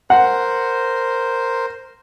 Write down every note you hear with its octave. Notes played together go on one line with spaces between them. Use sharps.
A#4 C5 F#5